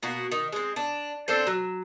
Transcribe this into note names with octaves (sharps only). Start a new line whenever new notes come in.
B2 A#3 F#4
D#3
G#3 C4
D4
C4 D4 A4 C5
F#3